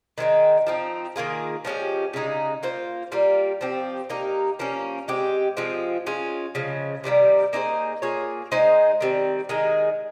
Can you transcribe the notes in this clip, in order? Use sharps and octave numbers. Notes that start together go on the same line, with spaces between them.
D#3 G#3 C4 D#4
F3 C4 D#4
D#3 A#3 F4 G#4
F3 G#3 C#4 G4
C#3 G#3 D#4
A#3 F4 C5
G3 A#3 F4
F3 C4 G4
A#3 D#4 G4 A#4
F3 A#3 C#4
G#3 C4 G4
F3 G#3 C4 F4
G#3 C#4 F4
C#3 F3 G#3
C3 D#3 G3 A#3
A#3 D#4 G#4 C5
A#3 F4 G#4 C#5
G#3 D#4 G#4 C5
D#3 G3 C4
D#3 G#3 D#4 G#4